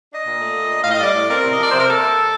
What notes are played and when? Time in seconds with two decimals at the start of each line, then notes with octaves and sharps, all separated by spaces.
0.12 D4 D#5
0.27 A#2
0.41 A3
0.56 A#2
0.71 D4
0.82 A2 F5
0.91 D#5
1.00 G3 D5
1.14 A2
1.29 C4 A#4
1.44 C3
1.53 D#5
1.58 F3 D5
1.70 C3 C5
1.79 A#4
1.87 A#3 A4